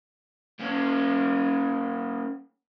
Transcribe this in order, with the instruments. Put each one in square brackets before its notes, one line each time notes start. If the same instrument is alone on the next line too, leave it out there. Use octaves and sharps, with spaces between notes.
[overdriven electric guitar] A#3 C#4